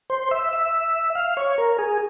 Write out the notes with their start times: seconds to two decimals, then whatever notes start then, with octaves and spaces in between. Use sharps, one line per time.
0.10 C5
0.31 E5
0.53 E5
1.15 F5
1.37 C#5
1.58 A#4
1.79 G#4